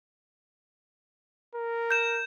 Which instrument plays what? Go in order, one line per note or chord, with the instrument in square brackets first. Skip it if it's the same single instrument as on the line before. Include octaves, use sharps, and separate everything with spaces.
[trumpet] A#4
[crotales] G6 E7